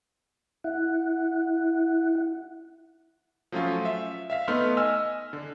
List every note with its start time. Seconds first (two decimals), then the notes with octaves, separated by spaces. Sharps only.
0.64 E4 F#5
3.52 F3 F#3 A3 C#4 F4
3.85 E5
4.30 E5 F5 B6
4.48 A3 B3 D#4 C6 F6
4.77 D#5 G#5 E6 F6
5.33 D3